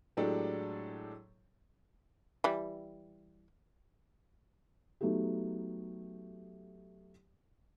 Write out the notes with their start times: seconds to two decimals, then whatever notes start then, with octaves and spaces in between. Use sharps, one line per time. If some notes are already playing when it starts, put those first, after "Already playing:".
0.17 A2 F#3 G#3 D4 G4 A4
2.44 E3 G3
5.01 F#3 A3 B3 D#4 G4